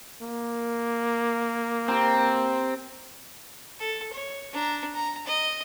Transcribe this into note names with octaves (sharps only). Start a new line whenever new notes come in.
A#3
C4 G4 A#5
A4
C#5
D4 A#5
A#5
D#5